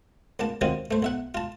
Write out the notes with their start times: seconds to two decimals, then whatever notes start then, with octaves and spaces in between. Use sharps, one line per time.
0.39 C#2 A#3 A5
0.61 D#3 F#3 G#3 C4 F4
0.91 A3 C5
1.02 B1 E5 F#5
1.35 F4 A5